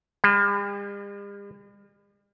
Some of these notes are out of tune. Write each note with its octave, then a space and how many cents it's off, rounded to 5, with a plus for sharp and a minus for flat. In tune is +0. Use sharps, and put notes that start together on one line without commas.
G3 +45